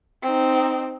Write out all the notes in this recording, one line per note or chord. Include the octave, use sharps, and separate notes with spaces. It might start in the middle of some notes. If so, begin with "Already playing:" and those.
C4 D#4